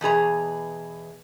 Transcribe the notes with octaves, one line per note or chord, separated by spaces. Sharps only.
E2 B2 G#4 A#5